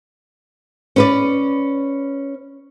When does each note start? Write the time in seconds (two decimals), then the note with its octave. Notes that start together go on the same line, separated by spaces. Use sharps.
0.96 C#4 B4 D5